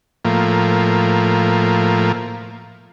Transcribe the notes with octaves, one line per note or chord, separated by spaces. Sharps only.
A2 F3 A#3